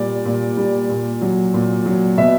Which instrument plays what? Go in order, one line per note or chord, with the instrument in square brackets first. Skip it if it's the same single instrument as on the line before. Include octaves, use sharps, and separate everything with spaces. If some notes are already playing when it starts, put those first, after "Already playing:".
Already playing: [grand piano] A#2 G3 D5
A#2
G3
A#2
F#3
A#2
F#3
B2 E5